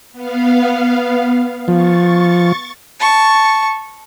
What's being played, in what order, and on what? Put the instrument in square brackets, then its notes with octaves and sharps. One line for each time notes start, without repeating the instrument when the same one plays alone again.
[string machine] B3 F5
[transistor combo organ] F3 [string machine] C#6 A6
[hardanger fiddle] A5 C#6